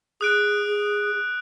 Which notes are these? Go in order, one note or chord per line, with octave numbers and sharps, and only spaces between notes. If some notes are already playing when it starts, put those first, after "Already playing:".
G#4 D#6 F#6 D7